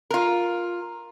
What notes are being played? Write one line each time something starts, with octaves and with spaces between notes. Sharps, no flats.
F4 A#4